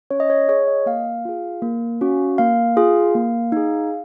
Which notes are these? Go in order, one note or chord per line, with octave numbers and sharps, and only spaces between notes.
C#4 C#5
D#5
C#5
G#4 C#5
D#5
A#3 F5
F4 G#4
A#3
C#4 F#4
A#3 F5
F4 G#4
A#3
D#4 G#4